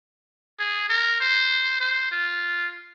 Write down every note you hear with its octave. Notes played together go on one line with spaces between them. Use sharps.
G#4
A#4
C5
C5
F4